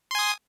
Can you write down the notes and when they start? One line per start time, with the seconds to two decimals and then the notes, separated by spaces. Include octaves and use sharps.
0.11 C6
0.15 G#5
0.19 D#6